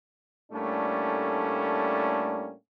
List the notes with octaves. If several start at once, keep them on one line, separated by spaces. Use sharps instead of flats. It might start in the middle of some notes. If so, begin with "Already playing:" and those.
A2 G3 A3 A#3 C#4 D4